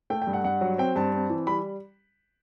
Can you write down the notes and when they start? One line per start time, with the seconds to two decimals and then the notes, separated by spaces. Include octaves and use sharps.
0.10 A3 G5
0.22 G5
0.27 G2
0.33 F#5
0.44 G2 F#5
0.61 F#3
0.78 C4 G5
0.96 G2 A5
1.14 C4
1.30 E3
1.47 G3 B5